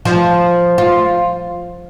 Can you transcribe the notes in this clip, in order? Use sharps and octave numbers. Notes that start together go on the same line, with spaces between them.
F3
F4